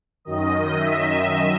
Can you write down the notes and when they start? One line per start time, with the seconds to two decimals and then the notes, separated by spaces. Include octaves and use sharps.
0.25 F#2 D#3 D#5
0.77 E5